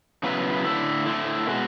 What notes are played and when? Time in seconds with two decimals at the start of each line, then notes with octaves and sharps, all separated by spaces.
0.23 C#3 F#3 B3 E4 B4
0.65 D3 A3 E4
1.06 D3 A3 E4
1.48 B2 G#3 B3 F#4